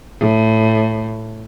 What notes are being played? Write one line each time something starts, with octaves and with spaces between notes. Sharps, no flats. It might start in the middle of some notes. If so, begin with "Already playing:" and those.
A2